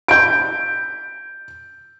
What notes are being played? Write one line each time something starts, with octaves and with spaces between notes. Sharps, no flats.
G6 D7